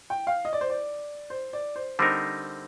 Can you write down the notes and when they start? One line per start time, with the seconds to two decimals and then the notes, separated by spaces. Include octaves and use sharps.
0.10 G5
0.27 F5
0.45 D#5
0.53 D5
0.61 C5
0.70 D5
1.30 C5
1.53 D5
1.76 C5
1.99 D3 G3 C4 D#4 A#4 C5